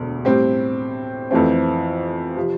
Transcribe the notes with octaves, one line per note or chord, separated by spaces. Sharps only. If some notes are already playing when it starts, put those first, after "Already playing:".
Already playing: E1 D2
A2 G3 C4 G4
F2 E3 A3 C4
C3 F3